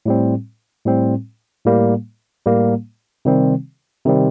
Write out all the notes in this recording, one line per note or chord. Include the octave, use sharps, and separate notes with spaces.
A2 G3 C4
A2 G3 C4
A2 G3 A#3
A2 G3 A#3
C3 D#3 G3 C4
C3 D#3 G3 C4